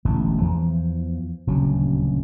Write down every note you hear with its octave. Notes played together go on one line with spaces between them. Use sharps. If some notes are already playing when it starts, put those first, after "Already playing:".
E1 A1 A2 D3
E2 E3 F3
D#1 D2 C#3 F#3